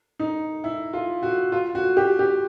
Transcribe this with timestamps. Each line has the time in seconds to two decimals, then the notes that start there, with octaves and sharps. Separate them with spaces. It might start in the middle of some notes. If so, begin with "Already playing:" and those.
0.19 D#4
0.64 E4
0.93 F4
1.22 F#4
1.52 F4
1.75 F#4
1.97 G4
2.19 G4